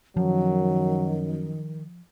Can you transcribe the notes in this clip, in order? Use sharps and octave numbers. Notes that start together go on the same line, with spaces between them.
F#2 D#3 F3 F#3